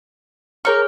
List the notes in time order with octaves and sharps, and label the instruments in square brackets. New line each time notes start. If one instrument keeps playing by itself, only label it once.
[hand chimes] G#4 C#5 F6 [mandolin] A#4 C#6